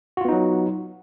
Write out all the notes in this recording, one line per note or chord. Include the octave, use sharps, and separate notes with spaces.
F#3 B3 D#4 F4 F#4